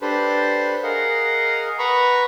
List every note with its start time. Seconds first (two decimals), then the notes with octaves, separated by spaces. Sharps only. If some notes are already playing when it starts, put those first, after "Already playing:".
0.01 D4 G4 A4 B4 C5
0.83 G#4 A#4 D#5 F5 F#5
1.79 B4 F#5 A#5 B5 C#6